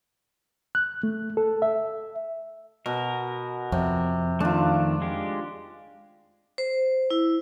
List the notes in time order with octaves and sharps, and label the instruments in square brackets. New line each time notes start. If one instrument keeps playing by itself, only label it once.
[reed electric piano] F#6
A3
A4
E5
[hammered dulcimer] B2 [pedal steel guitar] A#4
[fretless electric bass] F2 [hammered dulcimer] C3
[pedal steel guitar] D#3 A3 [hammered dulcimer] D4 F4
[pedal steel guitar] G#3 G4
[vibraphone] C5
E4